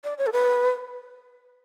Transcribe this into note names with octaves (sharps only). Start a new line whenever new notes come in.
D5
C#5
A4
B4